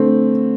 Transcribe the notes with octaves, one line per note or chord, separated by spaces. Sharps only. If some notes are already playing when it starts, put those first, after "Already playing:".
Already playing: D3 A3 C4